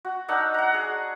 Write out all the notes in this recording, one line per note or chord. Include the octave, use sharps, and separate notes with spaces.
F#4
D4 D#4 F#5 E6
F#5 A#5
G#4